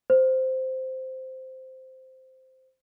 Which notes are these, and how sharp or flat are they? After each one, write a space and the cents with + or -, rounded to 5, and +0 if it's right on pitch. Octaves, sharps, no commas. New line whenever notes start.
C5 -5